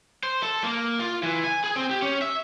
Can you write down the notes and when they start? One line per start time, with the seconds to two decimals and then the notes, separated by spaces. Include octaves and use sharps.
0.23 C5
0.43 A4
0.64 A#3
1.00 F4
1.23 E3
1.44 G#5
1.64 G#4
1.76 C4
1.91 G4
2.02 C#4
2.22 E5